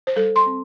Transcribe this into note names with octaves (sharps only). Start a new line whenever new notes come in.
C5
G3 A4
C6
C4